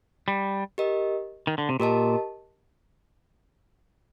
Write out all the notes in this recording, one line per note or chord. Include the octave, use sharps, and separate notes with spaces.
G3
G4 A#4 D#5
D#3
D3
C3
A#2 G4 A#4 D#5 A5